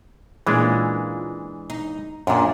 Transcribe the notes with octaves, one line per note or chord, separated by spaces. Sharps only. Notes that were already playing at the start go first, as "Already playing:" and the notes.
A#2 E3 G#3 C#4 D4
D#4
F#2 A#2 D4 G#4